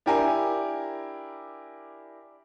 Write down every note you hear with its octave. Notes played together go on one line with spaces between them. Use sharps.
D4 E4 G4 A#4 G#5 A#5